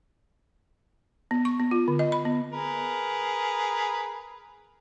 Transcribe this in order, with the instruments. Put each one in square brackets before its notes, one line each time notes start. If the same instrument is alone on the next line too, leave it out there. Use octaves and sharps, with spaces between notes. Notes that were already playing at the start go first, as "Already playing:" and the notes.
[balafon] B3
C#6
B3
F4
D3
D#5
B5
B3
[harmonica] G#4 A#4 B4